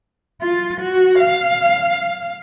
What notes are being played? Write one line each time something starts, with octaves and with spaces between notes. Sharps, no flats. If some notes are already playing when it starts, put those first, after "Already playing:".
F4
F#4
F5